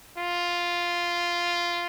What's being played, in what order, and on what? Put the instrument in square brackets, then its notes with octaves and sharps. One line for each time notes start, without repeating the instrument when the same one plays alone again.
[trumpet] F4